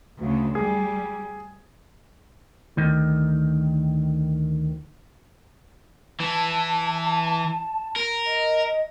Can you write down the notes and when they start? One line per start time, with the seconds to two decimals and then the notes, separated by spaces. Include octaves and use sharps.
0.18 D2 C#3
0.55 G3 G#4
2.77 D2 D#3
6.20 E3 A5
7.96 A#4
8.26 D#5